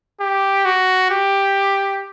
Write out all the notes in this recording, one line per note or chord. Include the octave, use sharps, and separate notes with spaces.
G4
F#4
G4